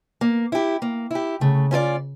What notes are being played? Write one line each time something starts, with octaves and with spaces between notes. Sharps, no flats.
A#3
E4 G4
A#3
E4 G4
C#3 A3
C#4 F4 A4 D5